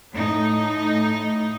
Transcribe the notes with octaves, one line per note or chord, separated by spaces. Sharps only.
A2 D#4